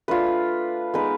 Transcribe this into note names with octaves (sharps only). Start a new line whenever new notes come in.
A3 D4 F4 B4
G#3 B3 D#4 B4